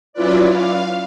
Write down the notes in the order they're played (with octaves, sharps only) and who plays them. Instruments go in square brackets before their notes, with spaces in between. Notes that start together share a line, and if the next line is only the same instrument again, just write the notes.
[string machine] F#3 C#4 E4 F4 B4 D5
F5